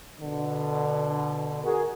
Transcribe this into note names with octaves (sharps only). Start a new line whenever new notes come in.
B2 D3
F#4 G#4 A#4